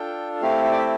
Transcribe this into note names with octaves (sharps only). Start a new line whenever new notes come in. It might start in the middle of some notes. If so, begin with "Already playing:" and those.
Already playing: D4 F4 A4 G5
A3 C4 E4 G4 F5
E5
D5
E5